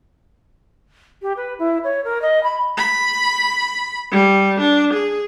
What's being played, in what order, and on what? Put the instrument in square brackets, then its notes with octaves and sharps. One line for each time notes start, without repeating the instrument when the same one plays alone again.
[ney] G4
B4
E4
C#5
A#4
D#5
B5
[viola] B5
G3
D4
G#4